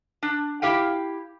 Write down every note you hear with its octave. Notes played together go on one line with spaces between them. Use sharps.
D4
E4 G4 F5 G5